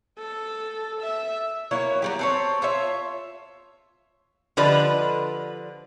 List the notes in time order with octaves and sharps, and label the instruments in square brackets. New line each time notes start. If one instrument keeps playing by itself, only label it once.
[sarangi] A4
E5
[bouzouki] F#3 A#3 E4 C#5
F#3 G3 G4
C4 A4 C#5
F4 C#5 E5
[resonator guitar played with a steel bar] D3 F3 B4 [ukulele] G4 D5 D#5